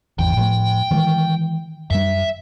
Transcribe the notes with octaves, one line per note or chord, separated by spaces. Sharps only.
G#1 E2 G5
A2 F3 A3
D#3 E3 G#3
F#2 G3 E5